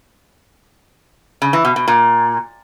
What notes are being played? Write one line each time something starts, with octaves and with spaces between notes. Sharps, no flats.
C#3
E3
B2
B2
A#2